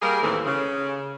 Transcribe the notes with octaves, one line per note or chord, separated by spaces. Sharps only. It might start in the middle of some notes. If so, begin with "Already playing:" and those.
G3 A#3 G#4 A#4
D#2 A2 E3 A3 C4
C#3